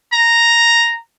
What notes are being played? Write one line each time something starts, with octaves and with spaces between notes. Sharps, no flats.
A#5